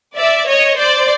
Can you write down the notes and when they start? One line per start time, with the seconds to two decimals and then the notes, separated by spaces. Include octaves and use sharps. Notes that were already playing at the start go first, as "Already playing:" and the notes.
0.17 D5 E5
0.48 C#5 D#5
0.78 C5 D5